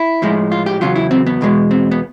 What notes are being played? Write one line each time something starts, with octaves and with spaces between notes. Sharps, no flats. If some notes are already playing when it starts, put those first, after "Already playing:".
Already playing: E4
A2 F3 G#3
F4
G4
E2 C#3 F#3 F4
E4
C4
B3
E2 B2 G#3
C4
B3